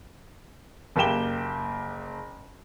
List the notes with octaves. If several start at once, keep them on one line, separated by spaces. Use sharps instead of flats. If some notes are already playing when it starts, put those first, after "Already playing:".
F#1 A#3 G4 G5 E7 G7